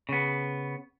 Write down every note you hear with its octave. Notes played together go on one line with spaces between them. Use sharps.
C#3 B3